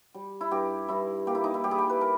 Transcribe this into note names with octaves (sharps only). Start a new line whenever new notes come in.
G3
E4
G2 G4
G2 E4
A#3 G4
E4
D#4
E4
G3 G4
G#4
G4
B4
A#4